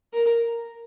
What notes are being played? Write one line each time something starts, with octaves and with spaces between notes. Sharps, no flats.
A#4